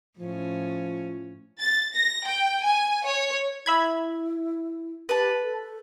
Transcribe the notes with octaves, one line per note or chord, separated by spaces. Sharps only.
A2 F3 C#4
A6
A#6
G5
G#5
C#5
E4 E5 B5 G#6
G4 B4 A5
A4